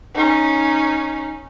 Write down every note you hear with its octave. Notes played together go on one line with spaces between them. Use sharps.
C#4 D#4